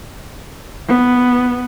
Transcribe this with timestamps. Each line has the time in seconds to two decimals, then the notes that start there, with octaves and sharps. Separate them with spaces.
0.88 B3